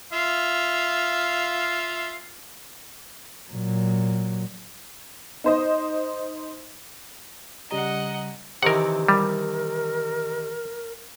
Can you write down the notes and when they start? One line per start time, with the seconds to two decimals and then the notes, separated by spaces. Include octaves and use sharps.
0.13 F4 E5 F5
3.51 A#2 F#3
5.44 D#4 C5 D#5
7.71 C#3 G3 D#5 F#5 A#5
8.63 C3 D#3 E3 A#4 F#5
9.09 G3 A#4